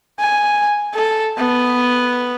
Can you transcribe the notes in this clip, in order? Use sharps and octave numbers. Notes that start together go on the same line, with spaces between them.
G#5
A4
B3